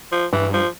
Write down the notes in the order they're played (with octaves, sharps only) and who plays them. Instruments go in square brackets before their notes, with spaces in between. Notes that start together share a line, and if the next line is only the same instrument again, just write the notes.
[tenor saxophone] F3
[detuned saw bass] G2 [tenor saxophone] E3
[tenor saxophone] F3